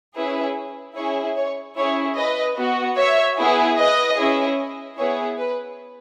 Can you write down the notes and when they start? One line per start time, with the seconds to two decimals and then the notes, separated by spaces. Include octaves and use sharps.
0.16 C#4 E4 G#4 B4
0.96 C#4 E4 G#4 C#5
1.37 C#5
1.76 C#4 E4 G#4 C#5
2.16 B4 D#5
2.56 B3 F#4
2.96 C#5 E5
3.38 B3 E4 G#4
3.77 B4 D#5
4.17 C#4 E4 G#4
4.97 B3 E4 G#4 C#5
5.38 B4